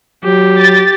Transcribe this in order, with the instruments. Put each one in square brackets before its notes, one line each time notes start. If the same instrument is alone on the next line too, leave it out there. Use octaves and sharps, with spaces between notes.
[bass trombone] F#3 [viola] G4
[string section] A6